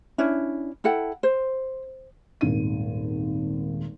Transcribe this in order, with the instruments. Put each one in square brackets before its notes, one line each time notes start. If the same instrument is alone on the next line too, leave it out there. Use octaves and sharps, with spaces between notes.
[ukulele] C#4 D4 E4
E4 A4 F#5 G5
C5
[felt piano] D#1 G#1 D#7